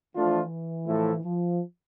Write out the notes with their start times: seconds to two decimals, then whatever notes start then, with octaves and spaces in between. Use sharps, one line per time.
0.15 E3 F3 A3 D4 F4
0.87 A2 F3 A3 E4 A4
1.23 F3